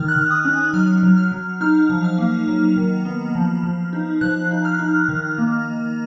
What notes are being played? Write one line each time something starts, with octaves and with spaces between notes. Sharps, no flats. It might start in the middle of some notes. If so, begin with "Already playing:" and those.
Already playing: D#3 D#4 F6
F#6
D#3
D#6
C#4
F#3 F6
F#3
F6
F#3
D#4 F6
F3
F6
A#3
F#3
D#3
B3
F3
F3
D#4
F3 F#6
D#4
F6
D#4
D#3
A#3